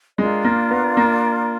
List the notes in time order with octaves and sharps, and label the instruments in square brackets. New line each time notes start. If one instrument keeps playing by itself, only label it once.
[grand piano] G#3 [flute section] D4 F4 A#4 D5
[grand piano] A#3
B3
A#3